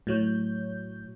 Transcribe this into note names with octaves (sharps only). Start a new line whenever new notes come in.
A2 F#3 C#5 G6